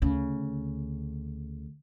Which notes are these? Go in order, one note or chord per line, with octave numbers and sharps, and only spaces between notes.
D2 C#3